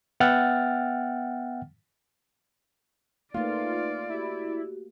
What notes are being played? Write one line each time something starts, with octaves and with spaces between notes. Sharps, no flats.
B3 E5 F#5 G5 F6 A6
A3 A#3 D#4 F4 B4 D5
E4 F#4 G4